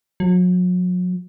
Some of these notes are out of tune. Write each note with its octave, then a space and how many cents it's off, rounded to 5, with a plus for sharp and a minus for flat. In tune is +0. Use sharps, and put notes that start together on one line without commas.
F#3 -40